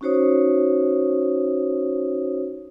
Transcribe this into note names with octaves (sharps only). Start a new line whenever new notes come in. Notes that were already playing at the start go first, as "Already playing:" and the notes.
C#4 D#4 F#4 C5 C#5 D#6